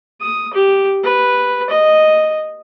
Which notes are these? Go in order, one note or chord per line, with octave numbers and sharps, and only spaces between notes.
D#6
G4
B4
D#5